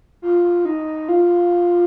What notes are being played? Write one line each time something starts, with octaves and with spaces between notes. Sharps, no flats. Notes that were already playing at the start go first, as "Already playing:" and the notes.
F4
D#4
F4